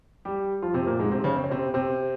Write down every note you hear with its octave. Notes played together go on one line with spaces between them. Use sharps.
G3 G4
F3 F4
C3 C4
A#2 A#3
G#2 G#3
C3 C4
C#3 C#4
C4
C#4
C3 C4
C3 C4